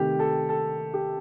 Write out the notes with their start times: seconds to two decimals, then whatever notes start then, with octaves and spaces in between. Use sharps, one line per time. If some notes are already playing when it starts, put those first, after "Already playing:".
Already playing: C3 D#3 A3 G4
0.19 A4
0.49 A4
0.94 G4